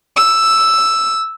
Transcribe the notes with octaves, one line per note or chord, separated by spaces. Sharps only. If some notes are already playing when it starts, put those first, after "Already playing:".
E6